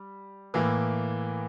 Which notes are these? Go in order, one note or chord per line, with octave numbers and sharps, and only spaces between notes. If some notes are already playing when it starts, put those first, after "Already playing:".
Already playing: G3
A2 E3 A#3